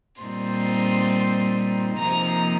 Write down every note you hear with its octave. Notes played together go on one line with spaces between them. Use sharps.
A#2 G3 C4 D#4 C6
C3 F3 A#3 D#4 A#5